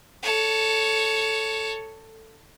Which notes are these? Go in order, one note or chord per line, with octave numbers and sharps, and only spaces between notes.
A4 C#5